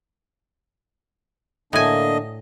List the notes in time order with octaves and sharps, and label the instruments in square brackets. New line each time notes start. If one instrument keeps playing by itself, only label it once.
[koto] A2 G#5 [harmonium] D3 A#3 D4 [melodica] D#5